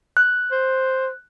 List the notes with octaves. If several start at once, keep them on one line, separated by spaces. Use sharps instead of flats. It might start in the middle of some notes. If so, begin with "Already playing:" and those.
F#6
C5